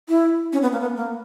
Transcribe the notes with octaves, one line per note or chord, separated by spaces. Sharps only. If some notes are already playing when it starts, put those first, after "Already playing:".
E4
C#4
B3
A#3
B3
A#3